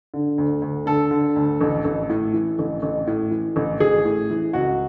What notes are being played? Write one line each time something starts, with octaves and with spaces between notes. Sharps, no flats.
D3
D2
D2
D3 A4
D3
D2
A1
A1
A2
E3
A1
A1
A2
E3
A1
A1 G#4
A2
E3
C#2 F#4